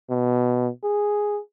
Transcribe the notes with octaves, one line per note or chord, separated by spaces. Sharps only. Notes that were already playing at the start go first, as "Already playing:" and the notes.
B2
G#4